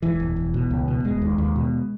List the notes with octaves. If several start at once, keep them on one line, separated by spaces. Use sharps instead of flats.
E1 E3
E1
E1
B2
C#2
B2
E1 G#3
D#2
D#2
B2